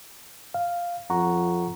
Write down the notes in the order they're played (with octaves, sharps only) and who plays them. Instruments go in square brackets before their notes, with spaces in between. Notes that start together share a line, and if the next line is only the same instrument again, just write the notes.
[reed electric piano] F5
[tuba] F2 [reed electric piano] F#5 A#5 C#6